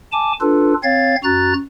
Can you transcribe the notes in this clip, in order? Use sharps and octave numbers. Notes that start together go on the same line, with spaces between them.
G#5 A5 D6
D4 F4 A4 B4
C4 C#5 F5 G#6 A6
F#2 F#4 A#5 F#6 A6